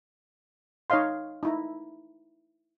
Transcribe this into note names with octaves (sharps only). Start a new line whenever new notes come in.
D#4 C#5 D#5 F5 C6
D#4 E4 A#5